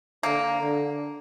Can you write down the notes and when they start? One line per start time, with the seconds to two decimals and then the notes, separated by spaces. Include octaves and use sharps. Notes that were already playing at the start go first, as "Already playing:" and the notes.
0.23 D3 A#3
0.61 D3